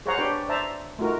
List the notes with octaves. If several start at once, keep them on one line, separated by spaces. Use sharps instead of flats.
G#4 C5 C#5 F5 F#5 A#5
D4 G4 B4 C#5 G5
C5 D5 E5 A5 A#5
A3 D#4 F4 F#4 A#4